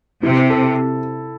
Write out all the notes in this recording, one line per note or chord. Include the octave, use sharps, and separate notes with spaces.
C3 E4
A4